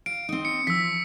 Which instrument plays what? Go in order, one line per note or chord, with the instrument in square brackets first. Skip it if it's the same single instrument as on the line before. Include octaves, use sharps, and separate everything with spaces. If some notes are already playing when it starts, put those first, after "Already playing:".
[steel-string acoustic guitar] F5 [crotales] D7
[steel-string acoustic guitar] C4 D#4
[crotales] C#7
[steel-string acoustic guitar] F3 [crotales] E6 B6